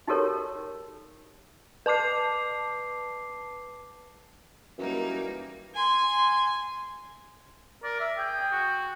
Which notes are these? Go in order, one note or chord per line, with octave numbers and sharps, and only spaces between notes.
D#4 F#4 G4 A4 A#4 C#5
B4 A5 D6 C7
F#2 E3 G3 A#3 D#4
G#5 C6
A#4 D5
E5
G#4 G5
F#4